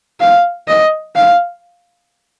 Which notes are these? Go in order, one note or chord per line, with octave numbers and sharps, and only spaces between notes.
F5
D#5
F5